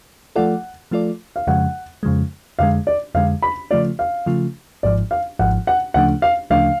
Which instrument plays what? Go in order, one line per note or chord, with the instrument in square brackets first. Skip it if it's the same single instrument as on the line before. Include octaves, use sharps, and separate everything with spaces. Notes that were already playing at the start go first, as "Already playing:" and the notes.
[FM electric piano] F3 A3 F4 A4 D5 [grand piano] F#5
[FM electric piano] F3 A3 F4 A4 D5
[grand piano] F5
[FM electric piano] F2 C#3 F3 G#3 [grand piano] F#5
[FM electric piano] F2 C#3 F3 G#3
[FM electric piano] F2 D3 G#3 [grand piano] F5
[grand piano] D5
[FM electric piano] F2 D3 G#3 [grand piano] F5
[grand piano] B5
[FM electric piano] C#3 F3 A3 F4 [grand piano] D5
[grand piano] F5
[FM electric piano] C#3 F3 A3 F4
[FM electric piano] G#1 G#2 F3 [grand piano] D5
[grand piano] F5
[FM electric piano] G#1 G#2 F3 [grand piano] F#5
[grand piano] F#5
[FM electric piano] D2 C#3 F3 A3 D4 [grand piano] F#5
[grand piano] F5
[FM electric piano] D2 C#3 F3 A3 D4 [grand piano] F5